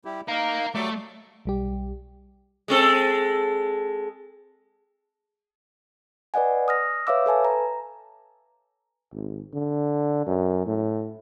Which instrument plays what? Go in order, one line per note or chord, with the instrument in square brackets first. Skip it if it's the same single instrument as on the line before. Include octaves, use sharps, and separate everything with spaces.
[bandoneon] G3 E4 G4
[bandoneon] A#3 D#4 [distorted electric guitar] A#4 F5
[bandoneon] F#3 G3 D6 [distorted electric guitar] A3
[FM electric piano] B1 G3 G4
[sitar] G#3 C4 A4
[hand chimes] B4 D5 D#5 F#5 G#5
D#6 F6 A#6
B4 C#5 E5 F5 D6 E6
A4 B4 G#5 A5
A#5
[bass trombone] G#1
D3
F#2
A2